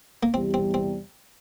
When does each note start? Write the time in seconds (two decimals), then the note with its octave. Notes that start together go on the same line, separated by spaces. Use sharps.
0.23 A#3
0.34 E2 C3 G3 C4
0.54 C4
0.74 C4